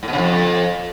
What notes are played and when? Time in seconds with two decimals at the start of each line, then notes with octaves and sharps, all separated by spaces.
0.03 A2
0.08 B2
0.13 C#3
0.18 F2